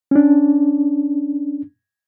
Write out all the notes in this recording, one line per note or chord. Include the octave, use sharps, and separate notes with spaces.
C#4 D4